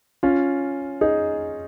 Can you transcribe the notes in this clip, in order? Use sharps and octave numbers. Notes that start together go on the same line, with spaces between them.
C#4 F4
D#4 G#4